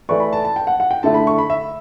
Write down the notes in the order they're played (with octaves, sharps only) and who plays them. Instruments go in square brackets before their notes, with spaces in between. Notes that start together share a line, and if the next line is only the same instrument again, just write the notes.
[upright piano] E3 A3 E4 B4 D5 [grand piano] C#6
[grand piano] B5
A5
A5
G5
F#5
F#5
G5
[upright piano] D3 A3 E4 [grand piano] A5
[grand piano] B5
C#6
B5
E5